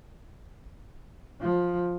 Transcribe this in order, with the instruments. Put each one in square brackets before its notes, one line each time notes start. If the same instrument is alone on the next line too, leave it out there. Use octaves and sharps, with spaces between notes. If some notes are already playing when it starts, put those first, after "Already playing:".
[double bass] F3